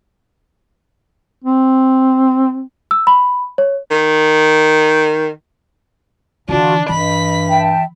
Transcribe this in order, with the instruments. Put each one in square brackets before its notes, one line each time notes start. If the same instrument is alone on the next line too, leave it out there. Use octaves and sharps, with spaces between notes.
[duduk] C4
[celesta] E6
B5
C#5
[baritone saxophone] D#3
[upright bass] D3 E3 [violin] D4 [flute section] F4 F#4 A5
[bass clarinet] G2 [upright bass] E3 [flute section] D#5 [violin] B5 B6
[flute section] E5 G5 A5